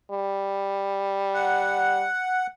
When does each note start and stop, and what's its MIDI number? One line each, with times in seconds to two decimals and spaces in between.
0.11 2.05 55
1.34 2.47 78